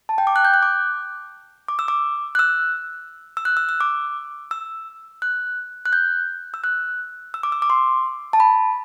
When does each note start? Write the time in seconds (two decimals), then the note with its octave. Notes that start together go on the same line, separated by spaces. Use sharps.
0.09 A5
0.18 G5
0.27 D6
0.36 F#6
0.45 G6
0.54 F#6
0.63 D6
1.68 D6
1.79 E6
1.88 D6
2.35 F#6
2.39 E6
3.37 E6
3.45 F#6
3.57 E6
3.69 E6
3.81 D6
4.51 E6
5.22 F#6
5.86 F#6
5.93 G6
6.54 E6
6.64 F#6
7.34 E6
7.43 D6
7.52 E6
7.62 D6
7.70 C6
8.33 A5
8.40 B5